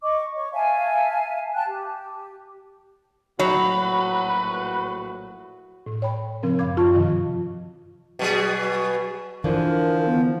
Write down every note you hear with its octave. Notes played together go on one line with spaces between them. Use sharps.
D#5 C#6 D6
C#5 C#6
E5 F5 G#5 A5
G5 A5 F#6
G4
A#1 A2 F#3 F#4 B4 C#5
A2
C#5 G5 B5
C#3 F3 C4 C#4 A#4
F#2 F5 B5 D6 G#6
F#2 F4 A5 C#6
G2 C3 D#3 F3
B2 F#3 G#4
D3 E3 F3 D4 A#4
B3